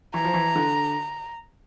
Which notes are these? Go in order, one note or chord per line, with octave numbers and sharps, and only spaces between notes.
E3 A#5
F3
E3
D3